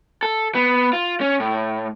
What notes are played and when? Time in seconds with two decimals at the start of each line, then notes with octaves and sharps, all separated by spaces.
0.23 A4
0.55 B3
0.93 F4
1.21 C#4
1.40 A2